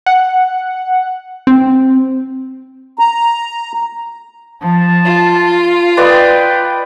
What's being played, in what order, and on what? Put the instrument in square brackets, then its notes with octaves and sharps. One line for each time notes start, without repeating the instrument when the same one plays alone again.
[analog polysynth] F#5
C4
[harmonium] A#5
[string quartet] F3 [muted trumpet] A5
[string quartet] F4
[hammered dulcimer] B4 D5 D#5 [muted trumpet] G5